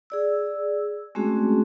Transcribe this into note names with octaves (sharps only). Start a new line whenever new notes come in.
G#4 D5 E6
G#3 A3 C4 C#4 F#4 G#4